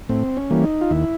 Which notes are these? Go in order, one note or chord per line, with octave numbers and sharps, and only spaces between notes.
A2 C4
C#4
E3 G3 A#3
D#4
F4
D#2 E4